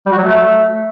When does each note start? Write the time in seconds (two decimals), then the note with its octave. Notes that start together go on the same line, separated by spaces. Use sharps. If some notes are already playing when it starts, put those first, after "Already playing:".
0.06 G3
0.12 F#4
0.18 F#3
0.24 A3